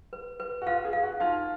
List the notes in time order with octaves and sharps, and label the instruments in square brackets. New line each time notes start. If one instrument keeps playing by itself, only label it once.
[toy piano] B4
B4
[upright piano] F#4
[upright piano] F4 [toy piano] F5
[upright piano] G#4
[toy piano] F5
[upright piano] F#4
[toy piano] D#4 [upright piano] F4